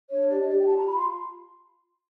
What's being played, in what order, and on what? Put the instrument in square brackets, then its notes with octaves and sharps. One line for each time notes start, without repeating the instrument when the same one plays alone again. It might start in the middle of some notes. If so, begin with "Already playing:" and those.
[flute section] D4 C#5
G4 D5
D#5
G4 D5
G5
F4 A5
A#5
F4 B5
C6